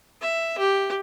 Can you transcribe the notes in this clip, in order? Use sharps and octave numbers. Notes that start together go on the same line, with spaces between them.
E5
G4